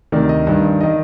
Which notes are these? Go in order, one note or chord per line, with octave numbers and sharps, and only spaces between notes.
D2 C3 D#3 D5
D#5
G2 D#3
D#3 D#5